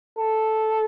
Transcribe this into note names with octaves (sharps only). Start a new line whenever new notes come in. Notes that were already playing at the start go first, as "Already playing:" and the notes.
A4